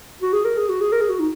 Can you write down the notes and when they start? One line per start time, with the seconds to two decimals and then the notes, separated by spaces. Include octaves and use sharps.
0.22 F#4
0.33 G#4
0.45 A#4
0.58 G#4
0.69 F#4
0.81 G#4
0.92 A#4
1.01 G#4
1.09 F#4
1.19 D#4